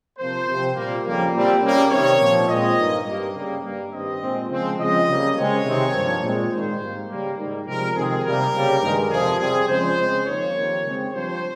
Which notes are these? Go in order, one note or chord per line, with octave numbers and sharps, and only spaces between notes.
C3 F3 A#3 C5
C3 F3 C4
A#2 G3 A#3
F2 C#3 G3 A#3
A#2 G3 C4
C#3 G3 A#3
C3 D#3 G3 C#5
A#2 F3 C4
A#2 G#3 C4 D#5
G2 D#3 A#3
G2 G3 A#3
C#3 G3 A#3
G2 G3 A#3
G2 D#3 G3 C4 D#5
A#2 G#3 C4
C#3 F3 G#3 C4
C#3 F3 G#3 C4 D#5
C#3 G3 A#3
C#3 G#3 C4 C#5
C3 D#3 G#3 C4
G2 F3 A#3
A#2 G#3 C4
G#2 D#3 A#3 C5
G#2 G3 A#3
C#3 G3 A#3
G#2 D#3 G3 A#3
C3 F3 G#3 C4 A#4
F2 C3 D#3 G#3 C4 G#4
C3 G3 A#3 A#4
C#3 G3 A#3
G2 D#3 G#3
F2 C3 F3 G#4
C3 G3 C4 G#4
C#3 F3 G#3 C4 C5
C#3 G#3 C4
F2 D#3 A#3 C#5
F2 D#3 G3 A#3
C#3 G#3 C4
G2 F3 C4 C5